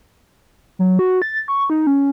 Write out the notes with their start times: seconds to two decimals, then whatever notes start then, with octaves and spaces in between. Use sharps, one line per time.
0.79 F#3
0.99 F#4
1.22 A6
1.48 C#6
1.70 D#4
1.87 C#4